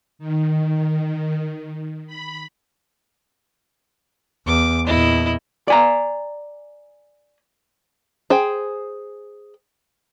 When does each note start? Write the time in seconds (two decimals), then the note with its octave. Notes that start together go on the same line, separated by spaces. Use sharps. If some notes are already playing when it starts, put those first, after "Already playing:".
0.19 D#3
2.07 B5
4.47 E2 D6
4.87 E2 A#2 E4 D#5
5.68 D5 G#5 A#5
8.30 G#4 C5 G5